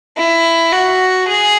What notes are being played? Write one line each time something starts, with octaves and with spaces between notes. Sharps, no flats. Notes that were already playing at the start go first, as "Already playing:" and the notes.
E4
F#4
G#4